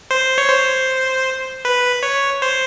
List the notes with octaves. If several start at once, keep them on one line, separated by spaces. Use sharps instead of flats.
C5
C#5
C5
B4
C#5
C5